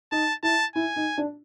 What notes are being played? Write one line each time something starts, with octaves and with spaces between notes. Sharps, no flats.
D#4 A5
E4 A5
E4 G#5
D#4
D4